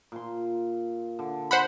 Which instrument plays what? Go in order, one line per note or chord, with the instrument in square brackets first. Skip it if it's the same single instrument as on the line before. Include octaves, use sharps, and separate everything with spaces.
[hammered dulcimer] A#2 C6
D3
[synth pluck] C5 F#5 B5